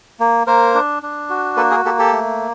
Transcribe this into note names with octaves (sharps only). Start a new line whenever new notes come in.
A#3
A#3 A#4 C5
D4
D4
F#4
A#3 A4 B4
G#4 A#4
A#3 G4 A4
G4 A4
A3